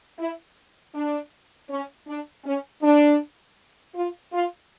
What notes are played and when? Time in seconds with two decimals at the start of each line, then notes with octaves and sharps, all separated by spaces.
0.19 E4
0.95 D4
1.70 C#4
2.07 D4
2.45 C#4
2.83 D4
3.95 F4
4.33 F4